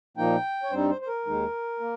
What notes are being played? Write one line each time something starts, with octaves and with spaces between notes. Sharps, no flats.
A#2 F3 A#3 D#4 G5
C#5
G2 G3 C4 D#4 C5
C5
C5
A#4
D#2 D#3 G#3 D#4
A#3